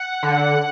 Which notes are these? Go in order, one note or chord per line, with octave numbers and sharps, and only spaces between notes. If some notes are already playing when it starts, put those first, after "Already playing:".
Already playing: F#5
D3